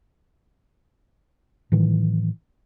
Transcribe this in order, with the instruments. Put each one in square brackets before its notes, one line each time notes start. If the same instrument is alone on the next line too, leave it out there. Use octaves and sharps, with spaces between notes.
[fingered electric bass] A2 D#3 E3 F#3